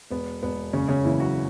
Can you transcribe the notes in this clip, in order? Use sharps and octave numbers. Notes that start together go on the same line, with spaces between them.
E1 B3
E1 B3
F#1 C#3 C#4
C#3 C#4
F#1 E3 E4
F#3 F#4